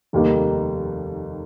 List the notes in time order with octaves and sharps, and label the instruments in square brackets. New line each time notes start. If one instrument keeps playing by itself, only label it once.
[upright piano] F1 D#2 D#3 G3 A#3